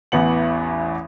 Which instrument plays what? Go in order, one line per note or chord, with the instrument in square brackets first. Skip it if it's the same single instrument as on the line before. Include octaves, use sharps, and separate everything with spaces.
[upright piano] A1 E2 B3 C#7 F#7